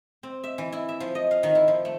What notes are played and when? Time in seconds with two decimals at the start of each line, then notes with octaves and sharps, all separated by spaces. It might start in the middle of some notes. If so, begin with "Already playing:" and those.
0.23 C4
0.44 E5
0.58 E3
0.72 E4
0.89 E5
1.00 F3
1.15 D#5
1.31 F5
1.43 D#3
1.55 E4
1.68 F3
1.85 A3